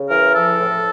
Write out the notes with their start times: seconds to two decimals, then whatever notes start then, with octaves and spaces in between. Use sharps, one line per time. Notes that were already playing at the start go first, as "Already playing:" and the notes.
Already playing: C#3
0.09 E3 A#4
0.33 F3 A4
0.58 A2